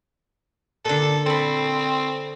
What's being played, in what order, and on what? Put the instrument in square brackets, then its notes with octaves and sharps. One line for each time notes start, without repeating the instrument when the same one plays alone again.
[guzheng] A#2 D3 [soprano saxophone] A4
[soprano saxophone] C4 [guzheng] A4 B5